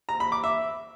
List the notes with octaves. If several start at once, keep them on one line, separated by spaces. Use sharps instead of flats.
A#5
B5
D6
E5